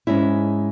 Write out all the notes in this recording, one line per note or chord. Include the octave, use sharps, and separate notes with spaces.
G#2 G#3 C#4 E4